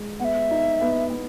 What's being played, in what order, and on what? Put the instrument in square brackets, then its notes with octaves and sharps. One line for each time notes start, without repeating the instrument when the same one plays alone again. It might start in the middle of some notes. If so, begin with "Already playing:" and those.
Already playing: [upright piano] G#3
[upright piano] B3 [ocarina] F#5
[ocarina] E5
[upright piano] D#4
B3
B3